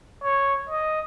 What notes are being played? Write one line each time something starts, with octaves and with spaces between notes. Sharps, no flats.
C#5
D#5